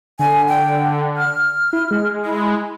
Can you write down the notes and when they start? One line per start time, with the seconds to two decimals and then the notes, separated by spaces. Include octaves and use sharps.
0.19 D3 G#5
0.48 G5
1.17 F6
1.73 E4
1.91 G#3
2.25 E4